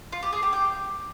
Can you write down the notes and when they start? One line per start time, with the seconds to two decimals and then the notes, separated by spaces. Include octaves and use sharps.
0.12 F4
0.22 G4
0.33 G#4
0.43 G4
0.53 G5